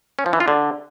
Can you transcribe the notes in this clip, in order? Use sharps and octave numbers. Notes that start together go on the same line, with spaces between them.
C#4
F3
E3
F4
D3